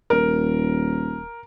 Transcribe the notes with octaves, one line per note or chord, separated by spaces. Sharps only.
D#1 A#4